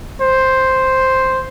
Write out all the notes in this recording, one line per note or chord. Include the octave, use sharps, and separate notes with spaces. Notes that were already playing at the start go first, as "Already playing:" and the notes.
C5